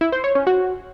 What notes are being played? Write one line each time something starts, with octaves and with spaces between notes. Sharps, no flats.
E4
C5
C#5
C#4
F#4